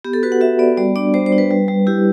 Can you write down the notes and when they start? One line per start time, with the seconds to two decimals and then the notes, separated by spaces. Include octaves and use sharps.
0.04 B3 G4
0.13 A4
0.23 F#4 B4
0.32 F#5
0.41 F#4 E5
0.59 B3 D5
0.77 G3 D5
0.96 D4 D5
1.14 G3 C5
1.26 C5
1.32 D4
1.38 B4
1.51 G3
1.68 G3
1.87 E4 G4